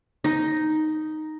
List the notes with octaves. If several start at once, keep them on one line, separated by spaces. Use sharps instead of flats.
D#4